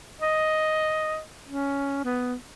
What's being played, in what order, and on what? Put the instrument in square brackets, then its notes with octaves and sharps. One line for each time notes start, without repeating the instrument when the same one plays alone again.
[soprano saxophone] D#5
C#4
B3